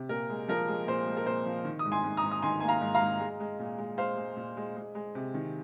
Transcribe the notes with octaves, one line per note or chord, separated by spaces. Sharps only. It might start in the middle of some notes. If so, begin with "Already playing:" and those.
Already playing: C3
A#2 A#4
G#3
F3 A#4
G#3
A#2 C5
G#3
A#4
A#2 C5
F3
D#3
D#6
G#2
G#5 C6
G#2
A#5 D#6
G#2
D#6
D#3 G#5 C6
A#3 G#5
F5 A#5
G#2
F5 A#5
G#2
G#3
G#3
A#2
G#3
G#3 C5 F5
G#3
A#2
G#3
G#3
G#3
C3
D#3